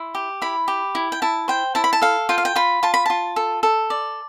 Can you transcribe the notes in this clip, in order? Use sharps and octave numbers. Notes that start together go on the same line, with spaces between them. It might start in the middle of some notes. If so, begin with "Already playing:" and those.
Already playing: E4 C6
G4
E4 B5
G4
E4
G5
E4 A5
C5 G5
E4 A5
B5
A5
A4 F5
F4 G5
F5
G5
F4 B5
F4 A5
B5
F4 A5
A4
A4
D5